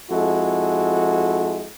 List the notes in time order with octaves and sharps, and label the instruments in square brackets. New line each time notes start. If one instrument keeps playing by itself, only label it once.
[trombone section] F2 G#3 E4 F#4 A4